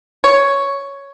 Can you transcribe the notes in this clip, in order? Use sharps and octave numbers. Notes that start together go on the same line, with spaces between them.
C#5